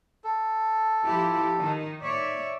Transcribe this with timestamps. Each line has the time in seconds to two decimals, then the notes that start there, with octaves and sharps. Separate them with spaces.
0.24 A4
1.06 F3 E4 G4
1.57 D#3 D#4
2.02 C#5 D5 E5